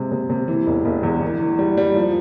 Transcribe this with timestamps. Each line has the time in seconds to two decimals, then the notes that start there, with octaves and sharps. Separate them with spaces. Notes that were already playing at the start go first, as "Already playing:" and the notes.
Already playing: C3 G#3
0.12 C3
0.30 C3
0.48 E3
0.67 E1
0.85 E1
1.03 E2
1.22 E3
1.41 E3
1.59 G3
1.77 G3
1.96 F3